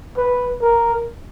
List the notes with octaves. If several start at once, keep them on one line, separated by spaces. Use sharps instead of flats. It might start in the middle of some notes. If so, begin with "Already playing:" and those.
B4
A#4